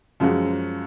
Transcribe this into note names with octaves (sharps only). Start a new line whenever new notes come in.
F#2 F3 G#3 C#4 F#4